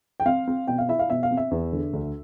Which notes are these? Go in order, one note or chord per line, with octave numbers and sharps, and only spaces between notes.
G5
C4 F5
C4
B2 G5
F5
E4 E5
F5
B2 E5
F5
C4
E5
E2
D3
D2